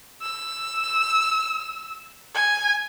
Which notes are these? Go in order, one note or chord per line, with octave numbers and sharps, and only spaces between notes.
E6
G#5